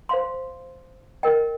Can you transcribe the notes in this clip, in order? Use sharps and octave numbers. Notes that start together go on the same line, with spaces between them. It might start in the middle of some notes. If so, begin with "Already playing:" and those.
C5 F5 C6
A#4 D#5 G5